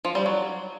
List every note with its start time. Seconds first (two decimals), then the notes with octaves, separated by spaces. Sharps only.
0.05 F3
0.15 G3
0.26 F#3